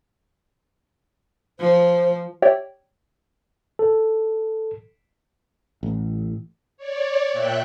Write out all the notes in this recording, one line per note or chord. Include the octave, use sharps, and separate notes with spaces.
F3 C5
G4 C#5 D5 E5 G5
A4
A1
C#5 D5
A#2 E5 G5 F#6